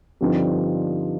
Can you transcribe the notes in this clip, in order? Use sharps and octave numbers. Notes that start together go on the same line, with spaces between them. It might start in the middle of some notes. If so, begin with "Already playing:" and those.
G2 D3 F3 C4 D#4